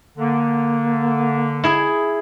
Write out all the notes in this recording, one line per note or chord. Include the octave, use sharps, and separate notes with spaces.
D3 A#3
E4 G#4